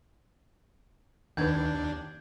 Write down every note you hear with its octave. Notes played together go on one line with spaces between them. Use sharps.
D#2 D#3 D4 B4 G6 G#6